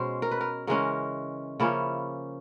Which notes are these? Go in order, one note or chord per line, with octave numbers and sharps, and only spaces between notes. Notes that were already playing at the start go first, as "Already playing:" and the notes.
Already playing: B2 G#3 C#4 C5
A#4
B4
A#4
C#3 E3 G#3 C#4 A#4
C#3 F3 A#3 C#4 E4